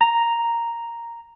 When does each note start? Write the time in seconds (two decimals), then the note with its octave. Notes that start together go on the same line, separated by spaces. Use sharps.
0.01 A#5